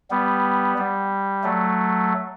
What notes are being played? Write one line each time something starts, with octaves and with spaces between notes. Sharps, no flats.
G3 B3
G3
F#3 A3